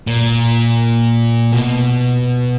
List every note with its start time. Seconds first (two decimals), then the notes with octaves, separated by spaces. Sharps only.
0.07 A#2
1.52 B2